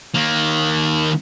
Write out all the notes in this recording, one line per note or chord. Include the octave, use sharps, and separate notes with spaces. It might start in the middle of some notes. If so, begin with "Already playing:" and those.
D#3 A#3